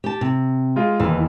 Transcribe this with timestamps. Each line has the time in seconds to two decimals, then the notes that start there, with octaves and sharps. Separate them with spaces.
0.04 G4 A5
0.21 C3
0.76 G#3 F4
1.00 E1 D#2 E3